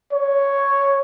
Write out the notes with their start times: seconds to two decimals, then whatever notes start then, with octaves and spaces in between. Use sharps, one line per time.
0.13 C#5